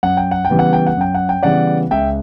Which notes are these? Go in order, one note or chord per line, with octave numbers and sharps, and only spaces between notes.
F#2 F#5
G5
F#5
G5
C#3 E3 G3 B3
F#5
G5
F#5
F#2 G5
F#5
G5
C#3 E3 G3 B3 D5 F#5
C#2 E5 G5